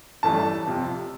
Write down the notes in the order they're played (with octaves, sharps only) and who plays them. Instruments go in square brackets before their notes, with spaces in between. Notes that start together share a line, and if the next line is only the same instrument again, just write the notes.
[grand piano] A1 G2 E3 A3 A5
F2 C3 F3